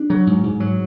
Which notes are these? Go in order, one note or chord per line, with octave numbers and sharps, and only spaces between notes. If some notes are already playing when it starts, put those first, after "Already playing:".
Already playing: D4
F#3
G#2
G#2
F#3